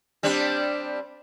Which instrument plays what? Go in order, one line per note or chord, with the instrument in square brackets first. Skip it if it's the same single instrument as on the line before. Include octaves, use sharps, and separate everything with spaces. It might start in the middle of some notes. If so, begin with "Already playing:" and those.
[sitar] G3 C4 D4